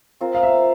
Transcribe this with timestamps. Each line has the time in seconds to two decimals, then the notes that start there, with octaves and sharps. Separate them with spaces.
0.21 C4 F4 A#4
0.35 F5
0.43 E5